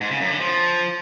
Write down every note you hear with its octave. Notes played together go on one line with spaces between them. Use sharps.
G#2
C#3
F#2
D3
F3